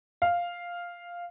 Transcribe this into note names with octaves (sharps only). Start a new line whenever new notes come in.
F5